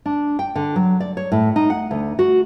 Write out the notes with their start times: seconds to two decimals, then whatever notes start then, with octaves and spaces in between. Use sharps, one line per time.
0.06 D4
0.39 G5
0.56 D3
0.76 F#3
1.00 D5
1.17 C#5
1.32 A2
1.56 D#4
1.70 F#5
1.91 D2
2.19 F#4